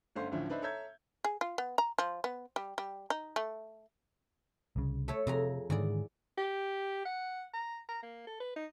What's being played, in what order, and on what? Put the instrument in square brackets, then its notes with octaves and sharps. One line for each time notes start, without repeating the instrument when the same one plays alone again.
[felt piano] G1 A3 C#4 C5 F5 C6
D2 A2 D3 F3 C#4
D4 D#4 B4 C5 E5
A4 C#5 E5 A#5 G6 G#6
[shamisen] G#4
F4
B3
A#5
F3
B3
G3
G3
D#4
A3
[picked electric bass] C2 C#3
[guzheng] A3 A4 C#5
[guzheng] F2 G#4 A#5 [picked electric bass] C3
[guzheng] E2 G#4 D5 [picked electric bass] G#2 D3 D#3
[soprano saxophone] G4
F#5
A#5
A#5
A#3
A4
B4
D#4